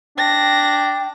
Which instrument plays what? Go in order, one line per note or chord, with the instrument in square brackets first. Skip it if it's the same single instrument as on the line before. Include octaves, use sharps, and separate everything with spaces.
[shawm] D4 [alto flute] G5 [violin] A#6